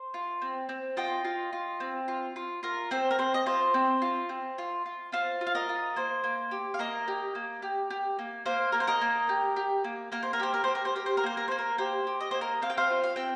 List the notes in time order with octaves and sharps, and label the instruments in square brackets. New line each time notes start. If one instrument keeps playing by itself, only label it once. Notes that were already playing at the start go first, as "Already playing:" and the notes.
Already playing: [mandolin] C5
F4
C4
C4
F4 D#5 G5
F4
F4
C4
F4
F4
F4 A#4
C4 C5
A#4
C4 C5
D#5
F4 C5
C4
F4
C4
F4
F4
F4 C5 F5
F4
F5
A#4 D#5
F4
A#3 C5
A#3
G4
F5
A#3 A#4 D#5
G4
A#3
G4
G4
A#3
A#3 C5 F5
A#3 A#4
C5
A#4 D#5
A#3
G4
G4
A#3
A#3 A#4
C5
A#4
G4 C5
A#4
G4 C5
A#4
C5
G4 A#4
C5
A#4
A#3 C5
A#4
A#3 C5
A#4
G4 C5
G4
D#5
A#3 C5
A#4 D#5
C4 F5
G5
C5 F5
F4
F5
C4 G5